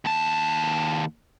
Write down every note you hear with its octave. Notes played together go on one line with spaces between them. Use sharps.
D#2 A5